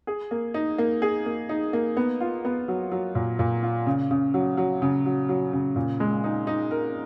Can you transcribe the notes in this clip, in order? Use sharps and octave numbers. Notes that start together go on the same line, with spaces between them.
G#4
A#3
D#4
A#3
G#4
A#3
D#4
A#3
B3
F4
B3
F#3
F#3
A#2
A#2
F4
C#3
C#3
F#3
F#3
C#3
F#3
F#3
C#3
A#2
G#3
D#4
D#4
A#4